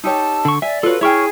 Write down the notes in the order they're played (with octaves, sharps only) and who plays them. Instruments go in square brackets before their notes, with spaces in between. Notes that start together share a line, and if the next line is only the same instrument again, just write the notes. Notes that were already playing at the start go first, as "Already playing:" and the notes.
[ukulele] D#4 G4 C#5 [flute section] A5 E6
[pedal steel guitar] D3 C#6
[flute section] D5 [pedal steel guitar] E5 [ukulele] G#5
[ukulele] F4 F#4 C#5 [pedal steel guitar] A4 B4
[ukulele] E4 G5 [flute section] G#4 [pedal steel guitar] C#5 C#6 F6